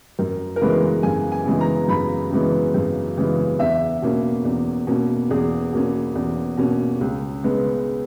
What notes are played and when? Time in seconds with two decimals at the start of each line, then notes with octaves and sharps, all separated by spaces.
0.19 F#2 A#4
0.56 A#4
0.60 C#3 E3 G#3 B3 B4
1.03 F#2 G#5
1.32 G#5
1.46 C#3 E3 G#3 B3
1.61 A#5
1.88 F#2 B5
2.31 C#3 E3 G#3 B3
2.74 F#2
3.17 C#3 E3 G#3 B3
3.59 E2 E5
4.02 B2 A#3 C#4
4.45 E2
4.87 B2 A#3 C#4
5.30 E2 G#4
5.73 B2 A#3 C#4
6.15 E2
6.57 B2 A#3 C#4
7.01 C#2
7.43 C#3 G#3 B3